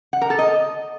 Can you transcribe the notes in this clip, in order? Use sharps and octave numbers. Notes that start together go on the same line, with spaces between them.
F#5
A#4
A4
D#5